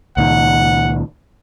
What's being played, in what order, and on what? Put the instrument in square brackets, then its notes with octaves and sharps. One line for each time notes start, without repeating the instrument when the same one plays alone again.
[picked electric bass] C#2 A#2 D#3 [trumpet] F#5